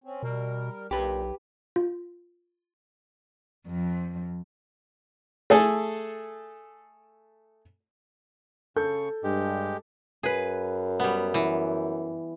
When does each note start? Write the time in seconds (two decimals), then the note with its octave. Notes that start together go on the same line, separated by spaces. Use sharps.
0.04 C4 C#4
0.23 B2 G3 A#4
0.91 B1 A#2 G4 B4
1.76 F4
3.66 F2
5.50 A3 G#4 A4
8.76 C#3 A4 C#6 G6
9.23 G2 G#3 G4
10.23 F#2 G#4 B4
11.00 G3 B3
11.34 E3